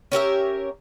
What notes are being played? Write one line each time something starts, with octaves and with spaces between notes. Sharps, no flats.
C#4 G4 A#4 E5